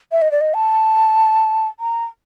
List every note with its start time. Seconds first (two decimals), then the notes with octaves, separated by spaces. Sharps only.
0.12 E5
0.22 D#5
0.31 D5
0.41 D#5
0.54 A5
1.80 A#5